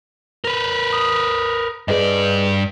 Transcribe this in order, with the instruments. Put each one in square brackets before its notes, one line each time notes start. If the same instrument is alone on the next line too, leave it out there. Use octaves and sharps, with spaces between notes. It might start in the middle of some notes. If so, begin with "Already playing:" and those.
[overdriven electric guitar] A#4 B4
[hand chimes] D#6
[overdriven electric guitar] G2 D5 [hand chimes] G#4 B4 D#5